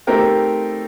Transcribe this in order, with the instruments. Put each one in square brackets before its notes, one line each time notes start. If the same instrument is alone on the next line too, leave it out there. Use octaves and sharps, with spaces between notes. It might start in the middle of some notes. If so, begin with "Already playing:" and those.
[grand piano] A3 C4 D#4 G4 A#4